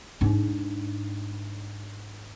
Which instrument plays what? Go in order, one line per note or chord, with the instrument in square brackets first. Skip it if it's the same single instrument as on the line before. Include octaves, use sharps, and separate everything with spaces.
[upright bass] G#2 D4